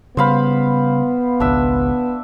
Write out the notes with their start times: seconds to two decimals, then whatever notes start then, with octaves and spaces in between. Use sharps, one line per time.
0.17 C#3 G3 B3 C5 F5 B5
1.40 G#1 C#2 D4 E5